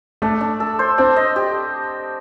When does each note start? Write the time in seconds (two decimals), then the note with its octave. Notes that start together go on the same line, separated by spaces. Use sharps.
0.22 A3 D4
0.41 D4
0.60 A4
0.79 C5
0.98 C4 D4
1.16 D#5
1.36 G4